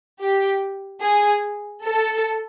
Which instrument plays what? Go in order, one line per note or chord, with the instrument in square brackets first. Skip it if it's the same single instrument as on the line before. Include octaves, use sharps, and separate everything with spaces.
[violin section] G4
G#4
A4